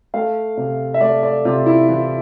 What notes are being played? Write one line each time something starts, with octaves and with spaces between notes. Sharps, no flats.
A3 F5
C3
E5
A3 D5
D5
C3 F4
E4
E3 F4